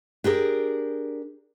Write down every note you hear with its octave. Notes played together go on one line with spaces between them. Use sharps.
D4 G4 G#4 A#4